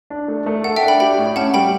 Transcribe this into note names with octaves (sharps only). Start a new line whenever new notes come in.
D4
A3
A3
A4 F#5
E5 G5
D4
G5 B5
G4 G5 B5
A2
C#4 F#5 A5
G3 G5 B5